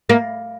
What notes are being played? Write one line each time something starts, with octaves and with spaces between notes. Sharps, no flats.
A#3